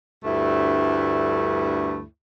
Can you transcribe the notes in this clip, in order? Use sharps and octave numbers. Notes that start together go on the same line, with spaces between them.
D2 G2 A3 E4